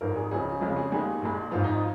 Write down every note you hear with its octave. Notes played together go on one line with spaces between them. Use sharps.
G#1 G#2 F3 A#4
G#4
C#2 C#3 F3 G#4
F2 C#3 G#3 F4
G#4
D#2 D#3 G#3 G#4
A#1 A#2 G#3
G#1 G#2 F3 F4
D#4
F4